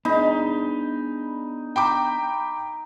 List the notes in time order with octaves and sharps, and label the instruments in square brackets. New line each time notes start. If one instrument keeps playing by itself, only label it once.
[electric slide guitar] B3 D4 G#4 [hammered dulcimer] D#4 [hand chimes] B5
[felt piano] G5 B5 D6 [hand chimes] A#5